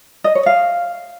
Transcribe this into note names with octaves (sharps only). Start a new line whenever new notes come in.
D#5
C#5
F5